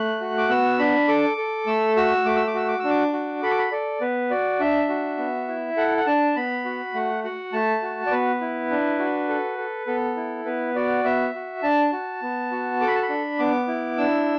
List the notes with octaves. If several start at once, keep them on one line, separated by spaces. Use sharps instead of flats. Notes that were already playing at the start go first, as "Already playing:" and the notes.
Already playing: A3 F#6
F#4
D6
B3 E6
D4 B5
A4 D6
A4
A3 E6
F#4 E6
A3 D6
E6
D6
F#4 E6
D6
D4 E6
D6
F#4
A4 B5
D6
B5
A4 D5
B3 B4
F#4 D5
D4 E5
F#4
B3
E4
A4 F#5
F#5
D4 A5
B3 B5
F#4
A3 F#5
F#4 F#5
A3 A5
F#4
D5
B3 B4
E4
D4
F#4
A4
A4
B3 A4
E4
B3 B4
F#4 D5
B3 E5
F#4
D4 A5
F#4
B3
F#4
A4 D6
B5
A5
B5
D4
B3 D6
E4
D4 E6